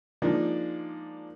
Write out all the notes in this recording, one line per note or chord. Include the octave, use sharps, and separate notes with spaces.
F3 G#3 A#3 D4 D#4